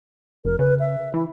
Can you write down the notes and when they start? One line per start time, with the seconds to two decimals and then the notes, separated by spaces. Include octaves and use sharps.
0.45 F1 A#4
0.59 C#3 B4
0.80 E5
1.14 E3 E4